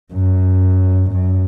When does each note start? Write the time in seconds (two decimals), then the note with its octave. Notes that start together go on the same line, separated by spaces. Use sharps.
0.13 F#2
1.12 F#2